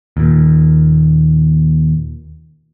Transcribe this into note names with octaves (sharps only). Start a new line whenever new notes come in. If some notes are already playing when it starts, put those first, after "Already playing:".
D#2 A#2